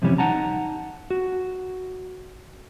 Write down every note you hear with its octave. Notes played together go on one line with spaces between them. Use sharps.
F2 C3 E3 G3 C#4
D#4 F#5 A5 A#5
F#4